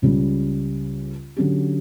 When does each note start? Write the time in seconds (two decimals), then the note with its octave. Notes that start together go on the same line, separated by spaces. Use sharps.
0.02 C#2 C#3 G3
1.37 D3 F#3 C#4 G4